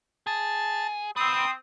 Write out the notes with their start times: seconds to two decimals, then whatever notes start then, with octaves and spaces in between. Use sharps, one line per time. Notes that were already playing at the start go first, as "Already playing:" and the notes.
0.27 G#4 A5
1.16 C4 D#4 B4 D#6